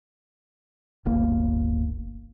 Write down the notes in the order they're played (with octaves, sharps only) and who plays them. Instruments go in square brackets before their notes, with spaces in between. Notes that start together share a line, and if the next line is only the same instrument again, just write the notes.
[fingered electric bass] D1 G1 A#3